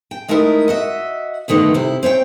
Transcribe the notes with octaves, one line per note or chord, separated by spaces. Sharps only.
G5
G#3 A3 D#4 E4 A#4
F#4 D#5 E5
G2 D3 D#3 A3 B3
C3 E4
C4 C#5 E5 G5